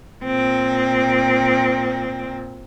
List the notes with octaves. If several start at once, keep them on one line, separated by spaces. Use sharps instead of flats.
A#2 C4